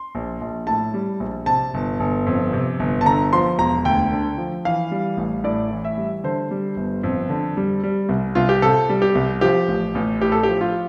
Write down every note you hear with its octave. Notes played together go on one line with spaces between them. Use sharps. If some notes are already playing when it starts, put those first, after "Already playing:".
Already playing: C6
A#1
A#1
A2 A5
G3
A#1
C3 A5
G1
G1
F2
C3
G1
A5
D3 A#5
F3 C6
E1 A#5
D2 G5
D3
F3
E3 F5
G3
A1
A2 D5
E3
E5
G3
D3 C5
G3
G1
F2
D3
G3
G3
C2
C2 F4
G4
C3 A4
G3
G4
C2
F3 G4
A1
A1
A2 G4
A4
F3 G4
F4